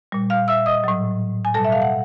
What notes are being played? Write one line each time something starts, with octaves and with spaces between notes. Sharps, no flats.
A#2 G3
F5 F6
E5 E6
D#5 D#6
A2 F#3
G#5
B2 G3 A4 A5
E5
F5
F#5